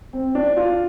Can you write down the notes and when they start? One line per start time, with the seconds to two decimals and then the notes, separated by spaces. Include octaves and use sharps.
0.13 C4
0.35 D4
0.57 F4